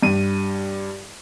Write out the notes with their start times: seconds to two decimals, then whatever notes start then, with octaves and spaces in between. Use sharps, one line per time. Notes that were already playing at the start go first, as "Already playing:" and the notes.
0.03 G2 D#7